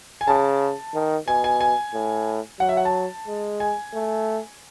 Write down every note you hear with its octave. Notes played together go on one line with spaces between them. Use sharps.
G#5
C#3 A5
D#3
B2 G#5
G#5
G#5
A2
F#3 F#5
E5
F#5
A5
G#3
G#5
A3